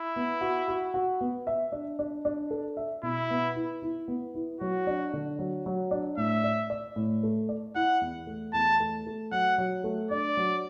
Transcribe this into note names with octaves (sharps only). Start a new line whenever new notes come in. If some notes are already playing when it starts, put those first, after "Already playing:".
Already playing: E4
B3
F#4
F#4
F#4
B3
E5
D4
D4
D4
A4
E5
B2 E4
B3
E4
E4
B3
E4
F#3 F#4
D4
D3
F#3
F#3
D4
A2 E5
D5
D5
A2
A3
D5
E4 F#5
E2
A3
E2 A5
A3
A3
F#3 F#5
F#3
A3
D4 D5
F#3